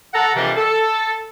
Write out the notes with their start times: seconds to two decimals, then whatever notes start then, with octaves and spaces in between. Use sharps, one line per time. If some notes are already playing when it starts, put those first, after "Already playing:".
0.14 A4 F#5 A#5
0.35 F2 C3 D#3 E3 G3 D4
0.56 A4